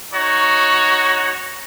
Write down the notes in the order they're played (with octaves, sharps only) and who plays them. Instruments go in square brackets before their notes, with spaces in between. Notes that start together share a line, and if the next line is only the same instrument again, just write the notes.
[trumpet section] D#4 F#4 C#5